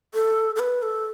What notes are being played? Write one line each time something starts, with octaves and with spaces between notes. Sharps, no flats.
A4
A4
B4
A4